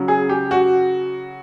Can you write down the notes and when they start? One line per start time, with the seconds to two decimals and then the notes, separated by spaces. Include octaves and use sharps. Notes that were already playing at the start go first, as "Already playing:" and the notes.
Already playing: C#3 F#3
0.08 G#4
0.29 G4
0.51 F#4